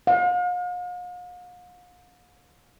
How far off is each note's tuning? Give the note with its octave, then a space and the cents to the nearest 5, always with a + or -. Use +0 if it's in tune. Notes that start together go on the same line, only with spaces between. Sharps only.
F5 +45